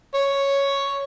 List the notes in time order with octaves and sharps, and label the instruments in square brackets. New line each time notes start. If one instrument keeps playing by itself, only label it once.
[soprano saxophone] C#5